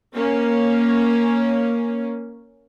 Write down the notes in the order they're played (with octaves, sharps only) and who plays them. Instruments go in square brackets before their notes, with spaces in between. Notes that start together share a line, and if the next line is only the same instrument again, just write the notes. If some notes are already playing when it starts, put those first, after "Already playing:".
[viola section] A#3 C#4